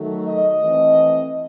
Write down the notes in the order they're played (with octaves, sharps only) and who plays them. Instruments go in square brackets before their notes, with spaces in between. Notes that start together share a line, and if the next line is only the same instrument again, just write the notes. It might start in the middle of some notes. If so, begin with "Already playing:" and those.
Already playing: [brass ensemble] D#3 F#3 A3
D#5
E3 A3 C4